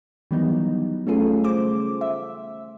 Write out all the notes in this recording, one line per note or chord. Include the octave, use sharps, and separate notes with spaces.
D#3 E3 F#3 G3 B3 D#4
A3 C#4 F4 G#4 A4
C#3 C5 D6
E5